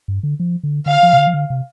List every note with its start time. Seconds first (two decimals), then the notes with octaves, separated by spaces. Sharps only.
0.08 G2
0.23 D3
0.40 F3
0.63 D3
0.86 D3 F5
1.03 F3
1.13 C3
1.18 D3
1.27 F3
1.34 D3
1.50 C3